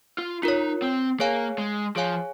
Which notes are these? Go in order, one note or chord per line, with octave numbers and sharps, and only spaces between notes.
F4
D#4 F4 A#4 C#5
C4
A#3 G#4 C#5 F5 G#5
G#3
F3 G#4 C#5 F5 G#5